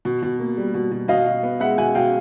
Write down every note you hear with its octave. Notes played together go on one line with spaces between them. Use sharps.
B2
B2
A#3
G3
B2
B2
B2 D#5 F5
B2
B3
G#3 E5 F#5
B2 F#5 G#5
B2 F5 G5